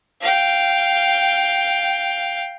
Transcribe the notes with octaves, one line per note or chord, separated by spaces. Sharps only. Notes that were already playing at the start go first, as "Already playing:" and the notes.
F5 G5